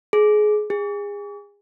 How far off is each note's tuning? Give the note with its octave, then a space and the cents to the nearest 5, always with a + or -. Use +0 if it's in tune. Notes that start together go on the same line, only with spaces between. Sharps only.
G#4 +25
G#4 -30